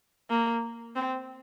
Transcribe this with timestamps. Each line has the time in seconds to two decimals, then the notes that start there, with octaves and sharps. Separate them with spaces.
0.30 A#3
0.96 C4